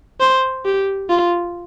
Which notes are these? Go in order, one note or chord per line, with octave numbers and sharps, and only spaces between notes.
C5
G4
F4